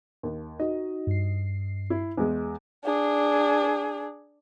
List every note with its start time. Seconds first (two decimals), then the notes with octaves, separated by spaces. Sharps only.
0.23 D#2
0.60 D#4 F#4 D#5
1.07 G2 C7
1.90 E4
2.17 E2 G#3
2.85 D4 G#4